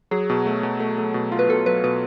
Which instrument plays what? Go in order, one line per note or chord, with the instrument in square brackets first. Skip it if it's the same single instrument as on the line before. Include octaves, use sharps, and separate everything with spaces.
[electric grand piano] F#3 [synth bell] G#4
[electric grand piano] B2
A3
B2
A3
A3
B2
F4
[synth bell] B4
[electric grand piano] B2 [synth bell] A4
[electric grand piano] F#3 [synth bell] B4
[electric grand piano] B2 [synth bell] B4